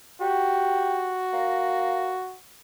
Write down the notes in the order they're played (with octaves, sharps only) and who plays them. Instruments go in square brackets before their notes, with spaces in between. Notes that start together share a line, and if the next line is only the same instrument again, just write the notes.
[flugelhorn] F#4 [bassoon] G4
[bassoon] A#3